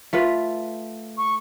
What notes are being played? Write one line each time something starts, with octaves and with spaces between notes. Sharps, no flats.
A3 F4 B4
C#6